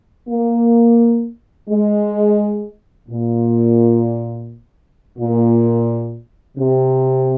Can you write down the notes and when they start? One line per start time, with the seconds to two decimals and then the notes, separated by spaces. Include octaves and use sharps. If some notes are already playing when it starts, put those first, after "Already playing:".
0.29 A#3
1.70 G#3
3.09 A#2
5.19 A#2
6.58 C3